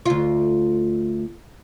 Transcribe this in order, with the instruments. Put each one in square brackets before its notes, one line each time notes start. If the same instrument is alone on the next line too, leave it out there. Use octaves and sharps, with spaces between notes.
[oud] D2 F4